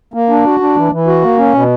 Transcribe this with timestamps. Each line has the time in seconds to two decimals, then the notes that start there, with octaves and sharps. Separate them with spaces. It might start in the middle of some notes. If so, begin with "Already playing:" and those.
0.14 A#3
0.29 D4
0.45 F#4
0.60 D4
0.76 E3
0.92 E3
1.07 F#4
1.22 A#3
1.38 C#4
1.54 B2